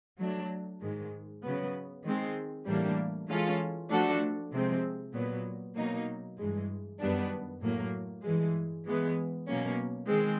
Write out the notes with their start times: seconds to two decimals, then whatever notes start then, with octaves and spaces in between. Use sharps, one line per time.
0.19 F#3 A3 D4
0.81 G#2 D#3 G#3
1.44 C#3 F#3 B3
2.04 D#3 G#3 C4
2.67 A2 E3 G3 A#3 D4
3.28 E3 G#3 C#4 F4 A4
3.90 F3 A3 D4 F#4 A4
4.51 C3 F3 G#3 C4
5.14 A#2 F#3 B3
5.76 B2 F#3 A#3 D#4
6.37 G2 E3 G#3
7.00 F#2 D#3 G3 B3 D4
7.61 A2 F#3 A#3
8.23 G2 E3 G#3
8.85 E3 G#3 B3
9.47 B2 F#3 A#3 C#4
10.08 D#3 G#3 C4